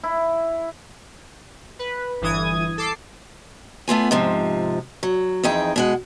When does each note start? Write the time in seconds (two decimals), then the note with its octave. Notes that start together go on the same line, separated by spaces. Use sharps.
0.04 E4
1.79 B4
2.21 G1 E3 D#6 G#6
2.78 A4 D6 C7
3.88 A3 B3 F4 G#5
4.11 G#2 C3 F3
5.03 F#3
5.44 F2 E3 D#4 G#4 G5
5.76 B2 G#3 F#5